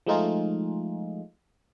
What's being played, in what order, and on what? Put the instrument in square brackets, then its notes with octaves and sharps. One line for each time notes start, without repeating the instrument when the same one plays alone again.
[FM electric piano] F3 G#3 A3 D#4 F4 G#4